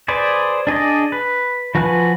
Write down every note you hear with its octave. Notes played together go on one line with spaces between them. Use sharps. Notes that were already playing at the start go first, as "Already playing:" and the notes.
G#4 B4 C5 D5
D4 G#4 D5 D#5
B4
F3 F#4 B4 G#5 F#6